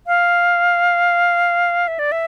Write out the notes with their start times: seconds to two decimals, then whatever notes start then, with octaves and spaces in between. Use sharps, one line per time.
0.07 F5
1.88 E5
1.99 D5
2.12 E5